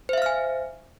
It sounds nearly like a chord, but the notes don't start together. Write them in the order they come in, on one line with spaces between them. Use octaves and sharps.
C5 E5 F5 F6 G#5